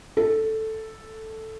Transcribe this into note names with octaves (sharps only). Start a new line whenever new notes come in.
A4